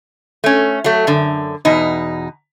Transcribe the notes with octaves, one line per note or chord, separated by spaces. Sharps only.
A3 C#4
F#3 A3
F#2 D3
E2 B2 D#4